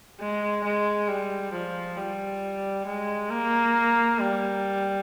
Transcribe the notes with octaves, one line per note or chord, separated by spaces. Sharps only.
G#3
G#3
G3
F3
G3
G#3
A#3
G3